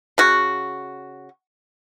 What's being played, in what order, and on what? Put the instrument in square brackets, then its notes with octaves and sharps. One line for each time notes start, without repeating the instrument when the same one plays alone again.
[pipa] C#3 F#4